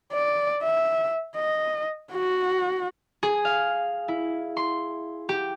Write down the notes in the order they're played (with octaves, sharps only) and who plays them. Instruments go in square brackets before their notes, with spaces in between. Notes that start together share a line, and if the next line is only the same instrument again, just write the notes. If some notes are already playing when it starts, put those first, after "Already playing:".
[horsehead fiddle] D5
E5
D#5
F#4
[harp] G#4
F5
E4
C6
G4